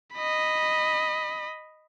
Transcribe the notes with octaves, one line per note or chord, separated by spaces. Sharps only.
D#5 B5